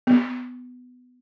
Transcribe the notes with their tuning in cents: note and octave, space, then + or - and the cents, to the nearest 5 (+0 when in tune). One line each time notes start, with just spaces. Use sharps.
B3 +15